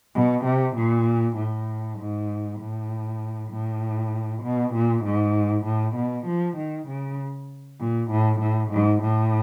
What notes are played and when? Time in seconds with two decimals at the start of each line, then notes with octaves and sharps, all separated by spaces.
0.15 B2
0.45 C3
0.76 A#2
1.36 A2
1.99 G#2
2.60 A2
3.51 A2
4.43 B2
4.74 A#2
5.04 G#2
5.65 A2
5.96 B2
6.27 F3
6.57 D#3
6.88 C#3
7.80 A#2
8.11 A2
8.40 A2
8.71 G#2
9.02 A2